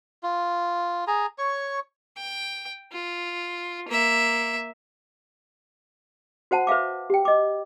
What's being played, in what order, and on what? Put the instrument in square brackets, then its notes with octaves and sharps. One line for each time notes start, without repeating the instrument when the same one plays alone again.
[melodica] F4
G#4 A#5
C#5 C#6
[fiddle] G5
F4
A#3 E5
[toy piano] F#4 C5 F#5 A5
B4 E5 F5 D6
G4 G5
D#5 D6